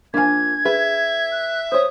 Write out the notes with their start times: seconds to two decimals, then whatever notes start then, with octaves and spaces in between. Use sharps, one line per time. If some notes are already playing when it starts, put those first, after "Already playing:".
0.14 F3 A#3 D4 G#5 G#6
0.65 G#4 B4 E5
1.32 F#6
1.72 C5 C#5 D#6